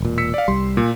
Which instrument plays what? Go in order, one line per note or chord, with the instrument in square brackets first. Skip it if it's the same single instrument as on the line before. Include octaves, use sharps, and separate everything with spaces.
[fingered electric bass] E1 A#2
[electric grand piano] E6 B6 C#7
D5 F5
[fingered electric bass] C2 G3 [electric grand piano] C6
[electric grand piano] A#2